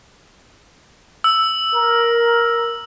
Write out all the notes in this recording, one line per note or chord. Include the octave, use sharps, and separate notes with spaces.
E6
A#4